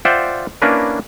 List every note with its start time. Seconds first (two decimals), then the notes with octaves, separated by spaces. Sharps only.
0.05 F4 C5 D5 E5 F#5 G5
0.62 A#3 C#4 D4 E4 A#4 B4